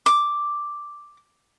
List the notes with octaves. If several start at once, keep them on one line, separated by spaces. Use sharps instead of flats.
D6